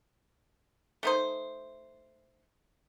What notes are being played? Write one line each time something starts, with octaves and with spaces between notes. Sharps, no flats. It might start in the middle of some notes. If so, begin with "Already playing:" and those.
A3 D#4 C5